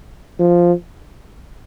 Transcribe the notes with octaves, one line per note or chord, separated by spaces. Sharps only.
F3